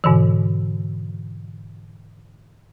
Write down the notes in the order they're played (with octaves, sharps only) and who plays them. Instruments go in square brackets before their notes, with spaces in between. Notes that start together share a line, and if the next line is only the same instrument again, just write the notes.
[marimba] G#2 B2 D3 E3